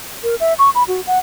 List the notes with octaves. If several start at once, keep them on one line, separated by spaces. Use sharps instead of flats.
A#4
E5
C#6
B5
F#4
F#5